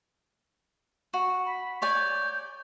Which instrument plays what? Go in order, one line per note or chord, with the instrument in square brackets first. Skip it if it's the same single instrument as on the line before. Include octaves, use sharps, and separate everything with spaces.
[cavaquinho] F#4
[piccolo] B5
[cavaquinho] C#5 D5 G#5 [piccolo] G6